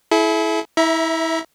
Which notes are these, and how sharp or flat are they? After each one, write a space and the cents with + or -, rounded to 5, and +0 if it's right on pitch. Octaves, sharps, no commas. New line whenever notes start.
E4 +0 A4 -45
E4 -25 E5 +0 A#5 +30